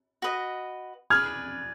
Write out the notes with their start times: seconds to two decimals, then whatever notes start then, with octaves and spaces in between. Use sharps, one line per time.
0.22 F#4 B4 D#5
1.10 G#4 B4 D5 F6 G#6